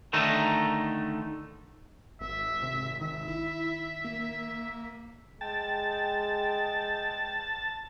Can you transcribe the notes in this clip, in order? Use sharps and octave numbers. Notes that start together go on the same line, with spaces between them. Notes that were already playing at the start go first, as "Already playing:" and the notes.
D3 D#3 A3 D#4
G#1 E5
C3
D#3 E5
E4
A#3
G#3 G5 A5